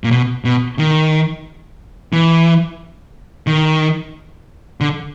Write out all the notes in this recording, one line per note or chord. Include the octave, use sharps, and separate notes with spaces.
A#2
B2
B2
D#3
E3
D#3
D3